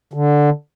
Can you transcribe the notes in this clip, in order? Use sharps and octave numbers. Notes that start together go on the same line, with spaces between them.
D3